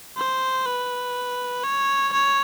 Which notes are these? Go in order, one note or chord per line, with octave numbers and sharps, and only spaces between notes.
C5
B4
C#5
C#5